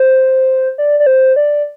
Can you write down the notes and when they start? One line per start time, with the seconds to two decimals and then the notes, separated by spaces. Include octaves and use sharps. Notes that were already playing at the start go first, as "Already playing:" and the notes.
Already playing: C5
0.78 D5
1.00 D5
1.06 C5
1.36 D5